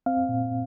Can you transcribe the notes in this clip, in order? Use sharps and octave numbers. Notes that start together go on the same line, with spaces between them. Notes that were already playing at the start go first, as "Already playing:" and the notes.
C4 F5
A#2